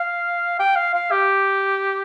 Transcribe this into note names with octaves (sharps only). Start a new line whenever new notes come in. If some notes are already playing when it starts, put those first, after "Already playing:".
Already playing: F5
G5
F5
F5
G4